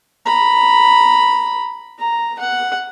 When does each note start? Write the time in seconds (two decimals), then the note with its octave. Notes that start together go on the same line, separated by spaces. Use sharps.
0.26 A#5 B5
1.99 A#5
2.39 F#5